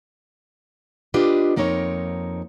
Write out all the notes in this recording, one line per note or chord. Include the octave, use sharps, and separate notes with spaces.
D4 F4 G4 B4 D#5
F2 A#3 C4 D#4 C#5